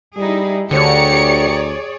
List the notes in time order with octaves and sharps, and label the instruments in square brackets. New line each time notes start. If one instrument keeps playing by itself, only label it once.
[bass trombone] G3 [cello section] D#4 E4 G#4
[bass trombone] D2 [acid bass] D3 [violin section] G4 A#5 C#7 [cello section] G#4 C#5 D5